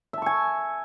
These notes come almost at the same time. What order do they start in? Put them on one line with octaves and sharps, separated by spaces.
E5 A5 C#6 G#5